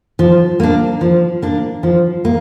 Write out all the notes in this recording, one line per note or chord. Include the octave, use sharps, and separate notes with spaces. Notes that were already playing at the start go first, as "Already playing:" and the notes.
F3
A#3 D4
F3
A#3 D4
F3
A#3